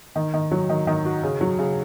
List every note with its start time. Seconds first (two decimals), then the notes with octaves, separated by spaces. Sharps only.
0.16 D#3
0.34 D#3
0.51 F#3
0.69 D#3
0.87 D#3
1.05 F#4
1.23 C#3
1.41 F#3
1.59 C#3